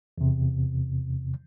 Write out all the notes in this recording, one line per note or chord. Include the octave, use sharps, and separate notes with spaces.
E2 C3